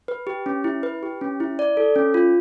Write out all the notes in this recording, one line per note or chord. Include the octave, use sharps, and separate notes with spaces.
B4
G4
C#4
E4
B4
G4
C#4
E4
D5
A4
C#4
F4